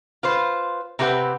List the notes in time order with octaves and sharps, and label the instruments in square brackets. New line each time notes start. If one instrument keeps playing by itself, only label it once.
[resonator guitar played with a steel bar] F4 B4 C5
C3 C4 G4 B4 F#5